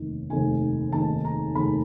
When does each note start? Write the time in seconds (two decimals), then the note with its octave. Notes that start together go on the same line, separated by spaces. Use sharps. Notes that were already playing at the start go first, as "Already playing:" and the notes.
Already playing: F1 D#2 D#3
0.30 F1 D#2 D#3 G#5
0.92 F1 D#2 D#3 A5
1.25 A#5
1.55 F1 D#2 D#3 B5